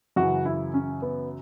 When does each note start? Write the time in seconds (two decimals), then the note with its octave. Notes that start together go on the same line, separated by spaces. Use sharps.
0.16 F#2 C#3 E3 F#4
0.45 E4
0.74 C#4
1.02 B3